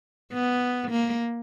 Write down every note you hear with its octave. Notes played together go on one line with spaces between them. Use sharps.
B3
A#3